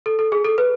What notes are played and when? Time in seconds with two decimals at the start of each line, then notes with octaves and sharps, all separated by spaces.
0.06 A4
0.19 A4
0.32 G#4
0.45 A4
0.58 B4